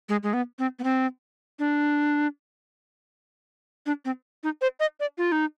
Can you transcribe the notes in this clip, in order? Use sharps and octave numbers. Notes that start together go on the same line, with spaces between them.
G#3
G#3
B3
C4
B3
C4
D4
D4
C4
D#4
C5
D#5
D5
F4
D#4